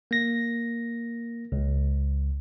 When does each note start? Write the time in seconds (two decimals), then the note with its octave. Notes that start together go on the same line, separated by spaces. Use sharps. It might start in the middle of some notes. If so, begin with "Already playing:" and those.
0.11 A#3 A#6
1.52 C#2